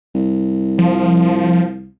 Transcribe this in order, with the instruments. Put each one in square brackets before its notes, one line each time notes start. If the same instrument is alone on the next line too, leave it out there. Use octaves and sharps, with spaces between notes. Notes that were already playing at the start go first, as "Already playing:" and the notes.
[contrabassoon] C2
[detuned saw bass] F3